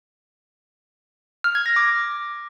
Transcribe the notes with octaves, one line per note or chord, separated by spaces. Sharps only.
F6
G#6
A#6
D6